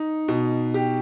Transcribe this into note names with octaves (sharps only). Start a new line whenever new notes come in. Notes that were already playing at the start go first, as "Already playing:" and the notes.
Already playing: D#4
B2
G4